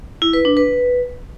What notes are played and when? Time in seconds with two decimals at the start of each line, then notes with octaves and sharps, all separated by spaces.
0.22 E4
0.33 B4
0.45 D4
0.57 B4